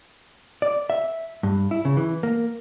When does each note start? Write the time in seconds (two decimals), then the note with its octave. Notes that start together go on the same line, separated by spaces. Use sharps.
0.62 D5
0.90 E5
1.43 G2
1.71 E4
1.85 C#3
1.97 E3
2.23 A#3